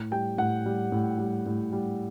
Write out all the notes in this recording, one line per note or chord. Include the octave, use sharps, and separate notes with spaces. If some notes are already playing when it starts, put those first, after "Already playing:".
Already playing: A2
G3 G5
A2 F#5
G3
A2
G3
A2
G3